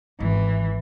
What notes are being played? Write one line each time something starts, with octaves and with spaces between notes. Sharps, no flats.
G#1 E3